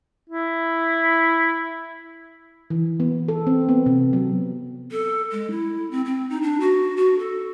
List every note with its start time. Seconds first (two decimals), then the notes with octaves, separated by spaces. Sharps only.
0.30 E4
2.70 E3
3.00 B3
3.28 A4
3.47 C4
3.69 B3
3.86 C3
4.13 F#3
4.92 A4
5.32 G#3
5.51 E4
5.91 C4
6.05 C4
6.30 D#4
6.42 D4
6.61 F#4
6.97 F#4
7.19 A4